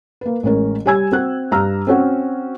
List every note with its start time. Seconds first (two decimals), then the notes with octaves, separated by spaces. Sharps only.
0.21 A#3 B4
0.43 A1 G#3 C#4 A#4
0.86 G3 C#5 G#5 E6 G#6
1.12 C4 F#4 F#6
1.52 G2 A#5 E6 F6
1.87 C4 C#4 F#4